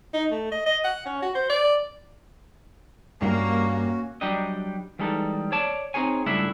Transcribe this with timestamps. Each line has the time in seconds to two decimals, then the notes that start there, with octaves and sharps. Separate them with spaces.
0.13 D#4
0.31 A3
0.52 D#5
0.66 D#5
0.84 F#5
1.06 C#4
1.22 F#4
1.35 C5
1.49 D5
3.22 G2 A#3 C#4 F#4
4.21 F#3 G3 D4 G4 D#5
4.99 E3 G3 G#3 D#4 A4
5.52 C#5 D5 A5
5.94 C4 D#4 G#4 C#5 G#5
6.26 C#2 G2 A3 D4 E4 E5